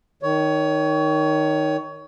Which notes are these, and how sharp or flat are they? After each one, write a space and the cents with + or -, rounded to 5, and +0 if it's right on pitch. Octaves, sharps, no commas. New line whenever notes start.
D#3 +0 C#5 +20